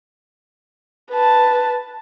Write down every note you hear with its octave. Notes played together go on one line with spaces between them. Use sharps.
B4 A5